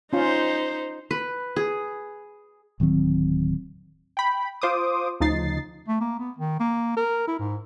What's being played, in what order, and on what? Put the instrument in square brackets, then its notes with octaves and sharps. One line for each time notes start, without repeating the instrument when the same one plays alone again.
[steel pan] C#4 F4 [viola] D#4 C5
[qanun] B4
G#4
[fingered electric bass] D1 D#3 F#3 C4
[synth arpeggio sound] G5 B5
F4 C5 D6 D#6
D2 C#3 F3 D#4 A6 C7
[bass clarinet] A3
A#3
B3
D#3
A#3
A#4
E4
G#2